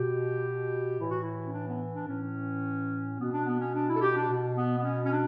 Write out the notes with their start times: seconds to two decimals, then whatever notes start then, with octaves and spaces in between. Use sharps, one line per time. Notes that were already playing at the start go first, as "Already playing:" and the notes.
Already playing: B2 G4
0.98 A2 E3 E4
1.10 F#4
1.22 E4
1.45 C#4
1.53 D4
1.68 B3
1.95 D4
2.09 A2 E3 C#4
3.19 B2 B3
3.32 D4
3.46 B3
3.60 C#4
3.74 D4
3.88 E4
3.95 A4
4.01 G4
4.15 D4
4.29 B2
4.56 B3
4.78 B3
4.84 C#4
5.06 C#4
5.12 D4